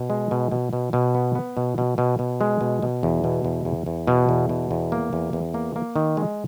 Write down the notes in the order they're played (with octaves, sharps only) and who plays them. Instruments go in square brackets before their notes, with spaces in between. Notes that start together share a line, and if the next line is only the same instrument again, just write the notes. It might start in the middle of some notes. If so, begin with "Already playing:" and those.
Already playing: [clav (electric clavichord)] B2
G#3
B2
B2
B2
B2
B3
B3
B2
B2
B2
B2
G#3
B2
B2
E2
B2
E2
E2
E2
B2
E2
B2
E2
A#3
E2
E2
A#3
A#3
D#3
G#3